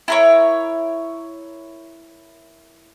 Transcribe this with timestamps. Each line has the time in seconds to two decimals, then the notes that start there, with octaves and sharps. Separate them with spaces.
0.08 E4 A#4 C#5